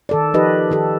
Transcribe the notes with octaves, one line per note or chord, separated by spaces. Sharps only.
D#3 A4 D5
F3 D#4 G4 B4 D#5
D#3 G4 A4